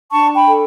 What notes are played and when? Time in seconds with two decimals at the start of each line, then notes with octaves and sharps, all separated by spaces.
0.11 D4 A5 C#6
0.35 G5 B5
0.46 A4